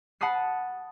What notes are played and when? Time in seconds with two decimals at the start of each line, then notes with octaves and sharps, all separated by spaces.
0.21 F#5 A5 B5 D#6 C7